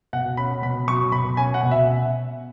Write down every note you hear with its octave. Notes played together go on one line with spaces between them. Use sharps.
B2 F#5
C#4 B5
B2 B5
F#3 C#6
B2 B5
C#4 G#5
F#5
B2
E5